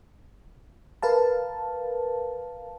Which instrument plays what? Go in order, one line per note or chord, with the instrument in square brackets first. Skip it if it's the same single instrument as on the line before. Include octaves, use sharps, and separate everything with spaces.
[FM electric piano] A#4 B4 F5 A5